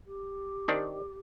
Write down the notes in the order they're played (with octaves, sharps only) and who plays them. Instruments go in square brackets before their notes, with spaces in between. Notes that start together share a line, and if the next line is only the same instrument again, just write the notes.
[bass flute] G4
[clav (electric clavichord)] D#3 C4 D4